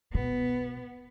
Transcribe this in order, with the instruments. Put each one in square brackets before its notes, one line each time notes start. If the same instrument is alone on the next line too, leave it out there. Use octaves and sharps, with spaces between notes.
[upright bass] B2 [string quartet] B3